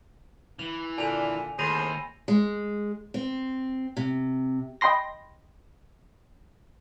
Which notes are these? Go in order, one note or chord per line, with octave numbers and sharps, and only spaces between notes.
E3 F7
A#2 D3 G#5 F7
D#2 A2 G#4 C5 B5 A#6 D#7
G#3
C4
C3
D#5 G5 B5 C6 A#6